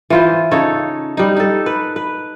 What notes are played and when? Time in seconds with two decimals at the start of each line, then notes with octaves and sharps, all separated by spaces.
0.10 E3 F4 C5
0.51 C#3 D#4 A4 C#5
1.17 G3 D#4
1.36 D#4 A4
1.66 B4
1.96 B4